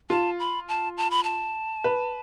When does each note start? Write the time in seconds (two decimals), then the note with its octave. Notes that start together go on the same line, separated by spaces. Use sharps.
0.10 F4 A5
0.39 B5
0.68 A5
0.97 A5
1.11 B5
1.24 A5
1.84 B4